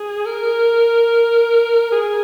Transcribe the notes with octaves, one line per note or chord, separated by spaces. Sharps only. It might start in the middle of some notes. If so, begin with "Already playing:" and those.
Already playing: G#4
A#4
G#4